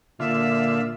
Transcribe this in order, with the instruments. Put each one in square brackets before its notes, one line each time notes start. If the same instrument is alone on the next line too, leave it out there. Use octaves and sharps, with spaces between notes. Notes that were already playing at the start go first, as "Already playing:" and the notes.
[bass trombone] A#2 [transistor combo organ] D3 F4 [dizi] E5